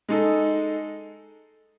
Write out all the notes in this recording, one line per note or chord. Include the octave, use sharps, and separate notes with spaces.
G#3 D#4 A4